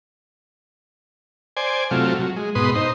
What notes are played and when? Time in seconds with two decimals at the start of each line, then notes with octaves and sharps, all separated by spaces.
1.57 C5 D5 G#5
1.91 C3 F#3 A3 F4
2.20 F#3
2.36 G#3
2.55 G#2 B2 B4 C6 D#6
2.75 D#4 C5